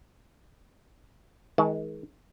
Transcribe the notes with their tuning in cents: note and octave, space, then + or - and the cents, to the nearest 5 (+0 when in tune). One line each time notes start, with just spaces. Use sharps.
D#3 +40 G#3 +15 A5 +0